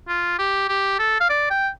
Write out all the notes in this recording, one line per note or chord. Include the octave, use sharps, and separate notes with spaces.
F4
G4
G4
A4
F5
D5
G5